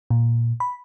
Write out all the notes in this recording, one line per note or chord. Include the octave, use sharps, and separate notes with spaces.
A#2
B5